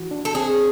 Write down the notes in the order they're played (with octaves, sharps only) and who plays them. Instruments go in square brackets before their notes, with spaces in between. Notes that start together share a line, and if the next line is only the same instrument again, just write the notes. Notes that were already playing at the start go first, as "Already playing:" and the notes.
Already playing: [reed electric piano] E3 F#4
D4
[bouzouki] A4
[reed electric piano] C4 [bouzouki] G#4